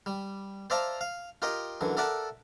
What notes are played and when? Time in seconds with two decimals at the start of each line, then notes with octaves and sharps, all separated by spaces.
0.06 G3
0.70 C5 D5 E5 F5 A5 A#5
1.01 F5
1.42 F4 G4 A#4 D#5 G5
1.81 F#2 D3 E3
1.97 A4 A#4 D5 E5 F#5 A5